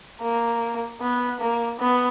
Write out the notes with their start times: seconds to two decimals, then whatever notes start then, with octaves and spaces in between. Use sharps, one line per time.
0.22 A#3
1.01 B3
1.40 A#3
1.80 B3